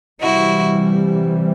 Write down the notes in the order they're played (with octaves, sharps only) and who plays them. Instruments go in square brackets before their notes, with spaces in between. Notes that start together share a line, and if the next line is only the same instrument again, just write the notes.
[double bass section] C3 E3 G3 [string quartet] E4 F#4